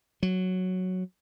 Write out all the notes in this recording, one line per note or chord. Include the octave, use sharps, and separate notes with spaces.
F#3